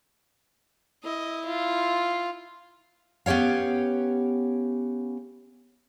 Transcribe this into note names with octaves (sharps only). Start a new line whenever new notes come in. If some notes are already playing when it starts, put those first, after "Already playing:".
E4 D#5
F4
B3 C#4 G4 C#5 F5